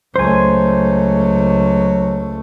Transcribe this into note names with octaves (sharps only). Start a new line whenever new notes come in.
C#2 F#3 A3 C5 G#5